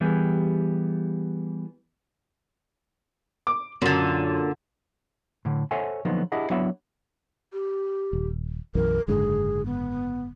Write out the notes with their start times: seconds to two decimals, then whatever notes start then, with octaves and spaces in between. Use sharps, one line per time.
0.01 E3 G3 B3 G4 G#4
3.47 D6
3.82 F#2 A#2 D3
5.45 A2 D3
5.71 A4 C5 C#5 E5 F#5 G#5
6.05 D3 F3 F#3 A#3 B3 D#4
6.32 D4 E4 G4 G#4 D#5 F#5
6.50 F#3 B3 D4 E4 E5 F#5
7.53 G4
8.13 D#1
8.75 B1 F#2 E3 A#4
9.08 F#1 G#2 D3 G#4
9.66 B3